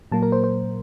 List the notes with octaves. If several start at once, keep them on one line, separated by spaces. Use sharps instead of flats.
A#2 F#3 A#3 A5
A#4
C5
C5